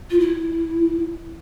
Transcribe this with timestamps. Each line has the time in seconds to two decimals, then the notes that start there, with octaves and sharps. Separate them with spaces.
0.10 F4
0.19 E4